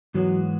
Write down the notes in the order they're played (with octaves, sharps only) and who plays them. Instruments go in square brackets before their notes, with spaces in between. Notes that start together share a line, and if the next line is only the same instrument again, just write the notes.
[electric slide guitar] G#2 E3 G#3 B3 F#4 [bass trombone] F#3